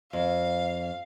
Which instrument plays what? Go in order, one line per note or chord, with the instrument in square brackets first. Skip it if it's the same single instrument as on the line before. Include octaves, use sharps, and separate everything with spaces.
[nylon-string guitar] F2 [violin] F5